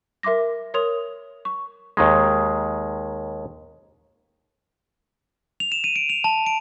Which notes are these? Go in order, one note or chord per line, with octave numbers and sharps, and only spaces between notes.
A#4 E5 C6 D6 A#6
A#4 C#5 C6 D#6 F7
C#6
D#2 D#3 G#3
F7
E7
D#7
D7
F7
A5
D7